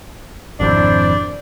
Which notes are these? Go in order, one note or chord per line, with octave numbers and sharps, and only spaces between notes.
G#1 F2 C3 D4 E4 C5 D5